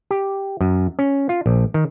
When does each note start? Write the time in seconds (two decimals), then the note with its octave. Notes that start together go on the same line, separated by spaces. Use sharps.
0.11 G4
0.61 F#2
0.99 C#4
1.29 F4
1.46 A#1
1.74 D#3